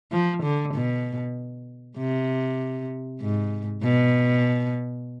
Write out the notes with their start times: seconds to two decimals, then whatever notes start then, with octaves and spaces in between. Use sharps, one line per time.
0.12 F3
0.43 D3
0.74 B2
1.98 C3
3.21 G#2
3.84 B2